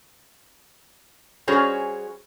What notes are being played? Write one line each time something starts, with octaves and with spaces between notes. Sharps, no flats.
G3 C#4 F#4 G#4 C5 C#5